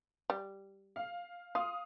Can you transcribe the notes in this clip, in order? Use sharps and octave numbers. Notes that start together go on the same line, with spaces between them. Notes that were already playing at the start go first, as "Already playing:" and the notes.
G3
F5
F4 F5 D#6